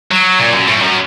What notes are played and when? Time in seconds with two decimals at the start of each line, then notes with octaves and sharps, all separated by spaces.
0.12 F#3
0.39 A#2
0.53 F#2
0.67 A2
0.82 F#2